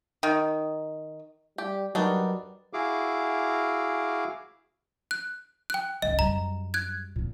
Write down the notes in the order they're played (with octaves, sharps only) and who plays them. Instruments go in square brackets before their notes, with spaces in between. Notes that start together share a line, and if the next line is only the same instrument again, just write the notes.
[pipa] D#3
[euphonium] G3 [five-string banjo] G4
[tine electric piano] F#3 A#4 B4 [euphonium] G3 [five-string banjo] D4 D#4 F#4
[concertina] E4 F#4 G#4 F5 D6
[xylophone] F#6
G5 F#6
[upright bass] C#2 D#3 [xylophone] D#5
[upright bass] F#2 G3 [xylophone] A#5
[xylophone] F#6 G#6
[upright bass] A#2 B3